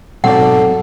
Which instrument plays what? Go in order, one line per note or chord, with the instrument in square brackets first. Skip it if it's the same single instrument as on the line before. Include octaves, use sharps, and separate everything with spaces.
[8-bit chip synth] G#2 B2 [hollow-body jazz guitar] F#3 C4 D5 [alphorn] A4 [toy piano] F#5